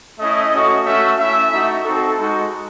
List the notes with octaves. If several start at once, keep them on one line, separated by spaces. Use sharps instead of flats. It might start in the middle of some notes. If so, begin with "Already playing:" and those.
A3 C#4 E4 D#5
A3 C#4 F#4
A3 C#4 F#4 E5
A3 C#4 E4 E5
A3 D#4 F#4
C4 D#4 F#4 A4
G#3 D#4 F#4